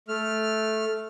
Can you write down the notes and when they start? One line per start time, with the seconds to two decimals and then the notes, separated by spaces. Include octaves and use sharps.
0.08 A3 F6